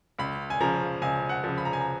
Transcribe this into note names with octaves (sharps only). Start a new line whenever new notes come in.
C#2 B5
G#5
C#3 F3 A#5
C#2 G#5
F#5
C#3 F3
B5
A#5
G#5
A#5